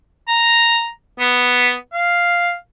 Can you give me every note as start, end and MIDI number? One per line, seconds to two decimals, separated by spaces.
0.28 0.88 82
1.20 1.71 59
1.93 2.54 77